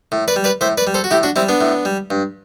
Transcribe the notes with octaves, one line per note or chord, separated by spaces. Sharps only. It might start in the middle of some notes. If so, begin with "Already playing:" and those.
A2
B4 D5
G3
B4 D5
A2 C5 E5
B4 D5
G3
A4 C5
F#4
A2 E4 G4
D4 F#4
G3 C4 E4
B3 D4
A2
G3
G2